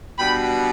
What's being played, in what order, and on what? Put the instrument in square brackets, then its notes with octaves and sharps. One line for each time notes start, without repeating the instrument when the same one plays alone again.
[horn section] B2 G3 D4 G5 B5